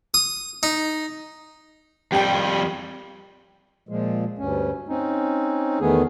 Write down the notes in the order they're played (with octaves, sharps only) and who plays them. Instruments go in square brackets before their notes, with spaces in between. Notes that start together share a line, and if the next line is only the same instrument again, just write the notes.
[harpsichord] D#6
D#4
[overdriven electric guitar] F2 G3 [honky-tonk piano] G4 G5
[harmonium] A#2 F3 G#3
D2 G2 C#4
C4 C#4 D#4
E2 D#3 A3 B3 G#4